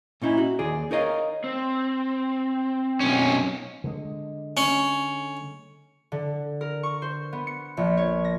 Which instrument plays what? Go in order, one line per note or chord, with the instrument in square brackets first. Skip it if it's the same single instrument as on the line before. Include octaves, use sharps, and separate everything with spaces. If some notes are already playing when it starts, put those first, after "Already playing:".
[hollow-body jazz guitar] A#2 C#4 D#4 E4
F#4
D#2 G#4 D5
D#4 A#4 C#5 D#5 F5
[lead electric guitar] C4
[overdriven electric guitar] B1 C#4
[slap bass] D3 G#3
[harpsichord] C#4
[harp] D3
A#4
C#6
C5
B3
C#7
A#1
C#5
A#6